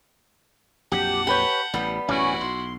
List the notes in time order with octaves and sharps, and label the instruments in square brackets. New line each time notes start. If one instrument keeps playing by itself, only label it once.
[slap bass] A#1 F2 F#3 [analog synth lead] G4 [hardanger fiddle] F#5 A5
[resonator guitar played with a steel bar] G4 B4 C#5 [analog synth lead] G6
[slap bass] A1 [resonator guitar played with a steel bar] G3 B3
[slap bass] A1 F#2 B2 [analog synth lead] C#4 [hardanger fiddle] E4 F#4
[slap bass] B1 [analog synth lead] C6